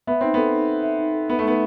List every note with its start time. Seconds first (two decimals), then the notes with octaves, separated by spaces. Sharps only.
0.07 B3 E5
0.21 C4 D#4
0.34 B3 A4
0.53 D#4
0.68 E5
0.83 E5
0.98 D#4
1.14 A4
1.29 B3 E5
1.39 A3
1.45 B3 D#4